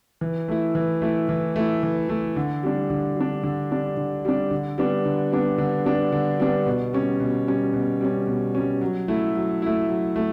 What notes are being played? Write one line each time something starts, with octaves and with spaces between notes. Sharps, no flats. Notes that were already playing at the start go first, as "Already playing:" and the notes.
E3
A3 E4
E3
A3 E4
E3
A3 E4
E3
A3 E4
D3
G3 D4
D3
G3 D4
D3
G3 D4
D3
G3 D4
D3
G3 B3 D4
D3
G3 B3 D4
D3
G3 B3 D4
D3
G3 B3 D4
B2
G3 C#4
B2
G3 C#4
B2
G3 C#4
B2
G3 C#4
F#3
A3 E4
F#3
A3 E4
F#3
A3